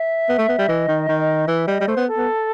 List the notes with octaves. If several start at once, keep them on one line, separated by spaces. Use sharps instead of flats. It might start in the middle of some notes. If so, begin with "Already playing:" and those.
Already playing: E5
B3
A3
B3
G3
E3 D#5
D#3
D#3
E3 E5
G3 D#5
G3
A3 C5
B3
A4
B3